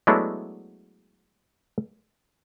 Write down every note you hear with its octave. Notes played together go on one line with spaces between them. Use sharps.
F#3 G#3 A3 B3 D4 E4